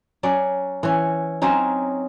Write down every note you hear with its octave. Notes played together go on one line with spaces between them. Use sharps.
F#3 C#4 D5
E3 C#4
F#3 C4 C#4 D#4